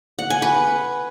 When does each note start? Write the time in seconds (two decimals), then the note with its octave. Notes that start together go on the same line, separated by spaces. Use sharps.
0.19 F#5
0.30 G#5
0.42 B4